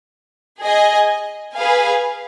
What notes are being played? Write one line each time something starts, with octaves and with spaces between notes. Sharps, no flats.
G#4 D#5 G#5
G#4 B4 F5 G#5